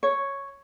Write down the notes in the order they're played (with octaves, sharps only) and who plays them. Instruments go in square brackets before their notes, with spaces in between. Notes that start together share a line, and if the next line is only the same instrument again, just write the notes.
[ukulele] C#5